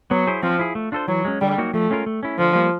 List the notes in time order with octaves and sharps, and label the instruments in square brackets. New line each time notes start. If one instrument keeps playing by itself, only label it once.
[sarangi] F#3 [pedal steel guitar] B3
[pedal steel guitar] E4 G#4 C5
[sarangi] F3 [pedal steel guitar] C4
[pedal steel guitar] E4 G#4
A3
D4 F4 A4 C5
[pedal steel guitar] E3 [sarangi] F#3
[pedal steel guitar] G#3 C#4
[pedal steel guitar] D3 [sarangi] G3
[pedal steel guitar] F#3 A#3 D#4 F#4
[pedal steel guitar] F3 [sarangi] A3
[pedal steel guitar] G#3 C#4 F4 A#4
A3
C#4 E4
[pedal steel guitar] D3 [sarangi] F3
[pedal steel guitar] G3 A#3